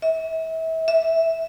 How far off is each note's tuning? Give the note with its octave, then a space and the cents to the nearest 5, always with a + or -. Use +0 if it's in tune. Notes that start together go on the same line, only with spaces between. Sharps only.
E5 -35
E5 -5